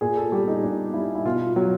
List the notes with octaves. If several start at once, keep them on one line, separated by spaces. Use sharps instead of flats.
A#2 G#4
A4
G3 G4
D#4
A#2 D4
G3 E4
E4
B2 F4
F#3